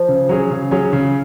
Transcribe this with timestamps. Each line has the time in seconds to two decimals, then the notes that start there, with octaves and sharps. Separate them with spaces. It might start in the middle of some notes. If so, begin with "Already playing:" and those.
Already playing: F3
0.09 C#3
0.29 F#3 C#4 G#4
0.51 C#3
0.71 F#3 C#4 G#4
0.93 C#3